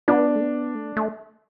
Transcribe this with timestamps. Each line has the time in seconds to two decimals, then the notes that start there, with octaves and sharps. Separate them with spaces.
0.08 B3 D4
0.36 A3
0.41 B3
0.75 A3
0.97 A3